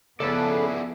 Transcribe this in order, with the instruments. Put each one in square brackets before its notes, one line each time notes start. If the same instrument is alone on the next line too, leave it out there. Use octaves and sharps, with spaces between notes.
[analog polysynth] C#3 B4 [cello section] F3 B3 [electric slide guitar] E4 G#4 D5 [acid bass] A4